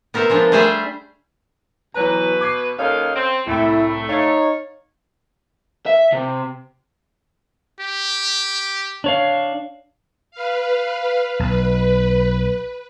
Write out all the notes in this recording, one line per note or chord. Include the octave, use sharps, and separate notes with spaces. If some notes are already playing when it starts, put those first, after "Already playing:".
B3 A#4 C5 E5
F3 G#3 D4
G3 A3 G#4 C5 E5 G5
B2 E3 F#3 B4 A#5
D6 G#6 C7
D#2 C#4 D#4 A4 F5
C4
C2 A2 A3 E4 G5
D#4 C#5 F5 A6
E5
C3
G4
D4 C#5 F5
B4 F5
B1 B4